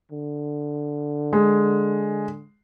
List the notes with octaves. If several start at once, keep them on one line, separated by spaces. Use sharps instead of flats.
D3
G#3